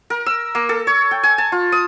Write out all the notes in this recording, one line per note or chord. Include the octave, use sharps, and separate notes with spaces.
A#4
E6
A#3
A4
C#5
G5
G#5
A5
F4
D#6